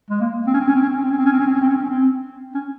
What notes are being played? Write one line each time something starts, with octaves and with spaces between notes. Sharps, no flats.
G#3
A#3
C4
C#4
C4
C#4
C4
C#4
C4
C#4
C4
C#4
C4
C#4
C4
C#4
C4
C#4
C4
C#4
C4
C#4
C4
C#4